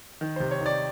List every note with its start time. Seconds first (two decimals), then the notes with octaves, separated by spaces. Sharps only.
0.21 D#3
0.36 C3 C5
0.51 C#5
0.61 D#3
0.66 D5